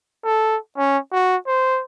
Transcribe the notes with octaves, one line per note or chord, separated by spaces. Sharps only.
A4
C#4
F#4
C5